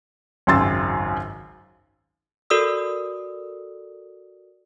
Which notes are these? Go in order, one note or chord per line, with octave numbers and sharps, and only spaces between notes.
G#1 C#2 F#2 C6 E6 A6
F#4 A4 A#4 D5 D#6 E6